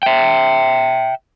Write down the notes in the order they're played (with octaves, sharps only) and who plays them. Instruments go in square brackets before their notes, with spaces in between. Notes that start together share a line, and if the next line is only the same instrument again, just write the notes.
[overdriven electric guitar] E5 G5